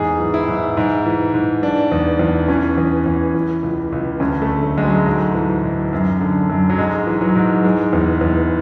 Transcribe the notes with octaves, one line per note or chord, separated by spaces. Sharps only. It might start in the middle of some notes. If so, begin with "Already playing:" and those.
Already playing: E2 G#2 G#4
E3
E4
G#2
G#2
E3
G#2
E3 D4
E2
E2
E3 C#4
E2
E2
E3
C#2
C#2
D2 C#4
A3
D3
A3
D2 G#3
F#3
G#2
E3
G#2
F#2
D3
F#2
F#3
G#2 G#3
E3
F#3
G#2
E3 G#3
E2
E2